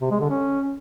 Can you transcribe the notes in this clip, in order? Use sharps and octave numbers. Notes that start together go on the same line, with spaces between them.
C3
G#3
D3
C#4